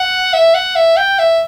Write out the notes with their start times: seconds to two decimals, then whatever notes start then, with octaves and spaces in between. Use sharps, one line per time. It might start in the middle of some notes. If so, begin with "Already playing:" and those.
Already playing: F#5
0.34 E5
0.54 F#5
0.75 E5
0.97 G5
1.19 E5